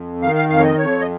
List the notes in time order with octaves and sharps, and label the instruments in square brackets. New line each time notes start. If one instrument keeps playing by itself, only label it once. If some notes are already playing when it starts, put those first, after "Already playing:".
Already playing: [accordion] F2
D#3 F5
F5
F2 F5
C#5
D#5
F2 C#5
D#5